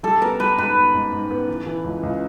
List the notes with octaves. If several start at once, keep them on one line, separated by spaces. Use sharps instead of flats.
G3 A4
B3 A#4
G3 B4
G#2 B4
B3
G#2
G#2
B3
E3
E3
C#2
C#2